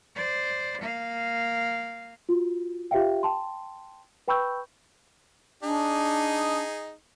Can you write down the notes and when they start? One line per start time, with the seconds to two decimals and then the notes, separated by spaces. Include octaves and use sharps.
0.16 C5 D5
0.82 A#3 F5
2.29 F4 F#4
2.91 F4 G4 C5 E5 F5 G5
3.23 G5 A5 C6
4.28 B4 G5 B5 C#6 E6 G6
5.63 D4 D#4 G#4